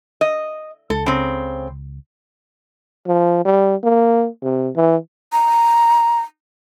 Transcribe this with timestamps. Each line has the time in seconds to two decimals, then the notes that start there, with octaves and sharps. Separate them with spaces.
0.21 D#5
0.90 C#2 A4
1.06 C#3 C4
3.07 F3
3.45 G3
3.83 A#3
4.43 C3
4.76 E3
5.33 A#5